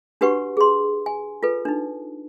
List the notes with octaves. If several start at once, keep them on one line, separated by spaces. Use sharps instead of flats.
D4 F#4 G4 B4 F#5 C#6
G#4 C6
G#5
F4 A4 B4
D4 D#4